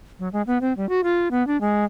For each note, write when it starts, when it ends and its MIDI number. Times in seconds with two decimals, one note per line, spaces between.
0.19 0.29 54
0.33 0.42 56
0.47 0.58 59
0.61 0.73 60
0.77 0.88 55
0.89 1.01 66
1.04 1.28 65
1.31 1.45 59
1.47 1.60 62
1.61 1.84 56